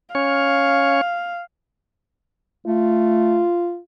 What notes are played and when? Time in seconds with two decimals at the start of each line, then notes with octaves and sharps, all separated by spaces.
0.15 C#4 C#5 F5
2.67 A3 F4